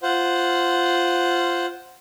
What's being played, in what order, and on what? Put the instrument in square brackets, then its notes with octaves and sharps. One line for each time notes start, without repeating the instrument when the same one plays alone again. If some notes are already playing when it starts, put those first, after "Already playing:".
[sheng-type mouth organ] F4 C5 F#5